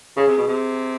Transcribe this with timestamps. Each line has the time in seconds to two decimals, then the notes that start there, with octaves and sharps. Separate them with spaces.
0.17 C#3 G#4
0.28 C3
0.38 B2
0.48 C3